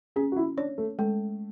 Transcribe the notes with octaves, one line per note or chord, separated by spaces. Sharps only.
C#4 G#4
F#4
E4
D4 C#5
A3
G#3 A3